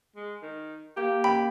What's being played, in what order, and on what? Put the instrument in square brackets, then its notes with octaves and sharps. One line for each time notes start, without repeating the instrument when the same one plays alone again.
[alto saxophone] G#3
D#3
[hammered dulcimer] A#3 [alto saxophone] G4
[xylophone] G5 [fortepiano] B5